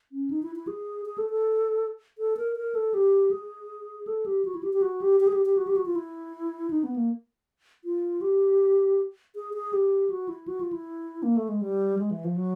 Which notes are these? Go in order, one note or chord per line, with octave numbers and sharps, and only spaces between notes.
C#4
D#4
E4
E4
G#4
G#4
A4
A4
A4
A#4
A#4
A4
G4
G#4
A4
G4
F#4
E4
G4
G4
F#4
G4
G4
G#4
G4
G4
F#4
G4
F#4
F4
E4
D#4
B3
A#3
F4
G4
G#4
G#4
G4
F#4
E4
F#4
F4
E4
A#3
A3
G#3
G3
G#3
E3
F3
F#3